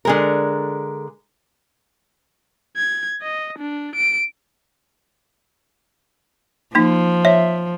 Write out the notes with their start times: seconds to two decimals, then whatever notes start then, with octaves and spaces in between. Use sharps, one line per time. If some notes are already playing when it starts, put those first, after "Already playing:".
0.05 D3 G#3 A#4
2.77 G#6
3.22 D#5
3.59 D4
3.96 D7
6.75 F3 A#3 D#4
7.25 C#5 E5